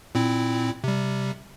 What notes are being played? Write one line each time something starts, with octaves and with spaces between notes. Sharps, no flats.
A#2 C4 E4
C3 G3